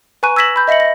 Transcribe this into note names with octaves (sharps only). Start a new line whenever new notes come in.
B4 G#5 A#5 C#6 F#6 D#7
E6 G#6 A#6 B6 E7 F#7
B5 G6
D#5 E5 A#6 C#7 F#7
A#6